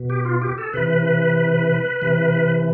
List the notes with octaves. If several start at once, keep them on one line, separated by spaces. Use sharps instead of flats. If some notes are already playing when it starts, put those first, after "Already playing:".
Already playing: B2
G4
F4
G4
A4
C3 E3 B4
C3 E3